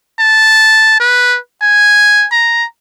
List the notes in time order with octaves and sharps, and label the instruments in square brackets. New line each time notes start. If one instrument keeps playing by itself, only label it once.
[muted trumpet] A5
B4
G#5
A#5